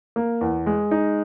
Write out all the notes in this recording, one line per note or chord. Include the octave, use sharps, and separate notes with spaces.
A#3
E2
G#3
D#4